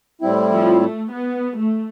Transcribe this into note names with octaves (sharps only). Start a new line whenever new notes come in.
A2 G3 C4 E4
F3
A3
B3
A3